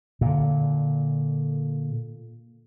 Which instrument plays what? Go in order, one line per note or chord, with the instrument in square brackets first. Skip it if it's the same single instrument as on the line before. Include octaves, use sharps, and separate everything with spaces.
[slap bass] A#2 D3